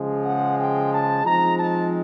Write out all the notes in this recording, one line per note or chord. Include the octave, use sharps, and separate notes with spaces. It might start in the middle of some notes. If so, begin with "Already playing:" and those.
Already playing: C#3 F3 G#3
F#5
G5
A5
F3 G#3 C4 D#4 A#5
A5